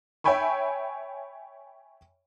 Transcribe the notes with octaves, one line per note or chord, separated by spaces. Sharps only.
C#5 E5 G5 G#5 B5 C#6